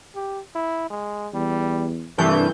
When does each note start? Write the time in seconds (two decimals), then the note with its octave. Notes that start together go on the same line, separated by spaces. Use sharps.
0.15 G4
0.55 E4
0.90 G#3
1.34 E2 G3
2.18 C2 G2 E3 A3 G6